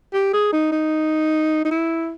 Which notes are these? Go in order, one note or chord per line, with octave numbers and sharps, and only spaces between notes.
G4
G#4
D#4
D#4
D#4
E4